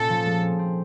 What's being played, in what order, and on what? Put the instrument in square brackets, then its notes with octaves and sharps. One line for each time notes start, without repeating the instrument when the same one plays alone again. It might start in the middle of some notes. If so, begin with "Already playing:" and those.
Already playing: [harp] A#2 A#3 C#4 [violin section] A4
[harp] F3
G#3
C4
C4